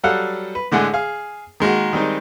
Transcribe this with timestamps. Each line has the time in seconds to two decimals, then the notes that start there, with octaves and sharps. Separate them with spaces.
0.03 F#3 G3 A4 F5 F#5
0.55 B4
0.72 A2 D3 G#3 F#5 G#5
0.94 G#4 F5
1.60 D#3 G#3 A#3 F#4
1.93 D#3 G3 G#3 C4 D#4